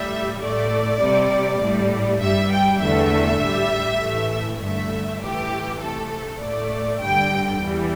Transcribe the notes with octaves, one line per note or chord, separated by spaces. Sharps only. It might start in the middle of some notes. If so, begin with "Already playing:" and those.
Already playing: A2 G3 E5
A2 A3 D5
C3 G3
A2 G3
G2 G3 E5
G5
E2 D3 A3 E5
A2 G3
A2 E3 A3
G2 D3 A3 E5
A2 E3 A3 G4
C3 A3 A4
A2 A3 D5
G2 D3 G3 G5
E2 E3 G3